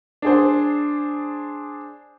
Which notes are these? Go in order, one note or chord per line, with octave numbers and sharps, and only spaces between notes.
D4 G#4 C5